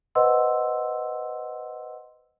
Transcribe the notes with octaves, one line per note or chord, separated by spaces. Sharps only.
B4 C5 D#5 F#5 C6 E6